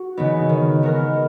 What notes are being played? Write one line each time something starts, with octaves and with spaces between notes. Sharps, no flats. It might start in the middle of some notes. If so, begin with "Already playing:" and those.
Already playing: F#4
C#3 E3 B3 D#4
D#3
G#3 B3 F#4 A#4